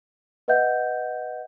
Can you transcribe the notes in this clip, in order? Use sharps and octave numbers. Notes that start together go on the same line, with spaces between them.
B4 D#5 E5 F#5 G6